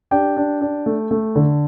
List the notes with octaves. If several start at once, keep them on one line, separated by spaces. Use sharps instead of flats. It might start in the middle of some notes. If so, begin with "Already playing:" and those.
D4 G4 G5
D4
D4
A3
A3
D3